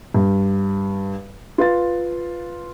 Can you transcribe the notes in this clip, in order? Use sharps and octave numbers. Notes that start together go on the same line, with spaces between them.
G2
F4 B4 A6